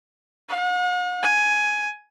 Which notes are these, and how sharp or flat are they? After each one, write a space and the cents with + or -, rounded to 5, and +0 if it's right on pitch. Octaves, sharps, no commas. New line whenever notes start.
F#5 -45
G#5 +10